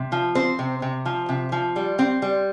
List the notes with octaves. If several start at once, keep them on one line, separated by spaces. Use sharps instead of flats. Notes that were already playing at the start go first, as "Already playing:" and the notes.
Already playing: C3
F3
C4 C5
C3
C3
F3
C3
F3
G3
C4
G3